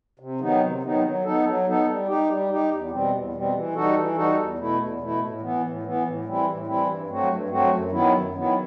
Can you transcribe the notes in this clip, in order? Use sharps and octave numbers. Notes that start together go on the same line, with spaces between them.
C3
D#3 F#3 B3 D#4
C3
D#3 F#3 B3 D#4
F#3
B3 D#4 A4
F#3
B3 D#4 A4
G3
D#4 G4
G3
D#4 G4
E2
B2 G3 C4
E2
B2 G3 C4
E3
G3 D#4 F#4 A4
E3
G3 D#4 F#4 A4
E2
B2 A3 E4
E2
B2 A3 E4
A2
E3 B3
A2
E3 B3
A2
E3 G3 C4 E4
A2
E3 G3 C4 E4
G2
F#3 A3 C4 F#4
G2
F#3 A3 C4 F#4
F#2
D#3 F#3 B3 E4
F#2
D#3 F#3 B3 E4